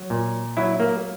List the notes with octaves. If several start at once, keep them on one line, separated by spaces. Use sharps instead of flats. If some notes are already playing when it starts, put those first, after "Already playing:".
Already playing: F#3
A#2
F#3 E4
A#3